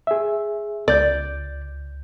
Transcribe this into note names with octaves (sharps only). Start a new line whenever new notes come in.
G#4 E5
C#2 D5 G6